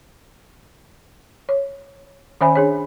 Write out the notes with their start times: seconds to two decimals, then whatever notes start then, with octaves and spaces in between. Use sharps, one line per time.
1.49 C#5
2.41 D#3 C#4 C5 E5 G#5 B5
2.55 D4 G#4 C#5